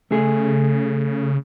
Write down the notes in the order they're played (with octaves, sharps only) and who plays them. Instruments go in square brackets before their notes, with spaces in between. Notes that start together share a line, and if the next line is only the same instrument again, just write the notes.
[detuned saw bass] C#3 [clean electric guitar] A3 G#4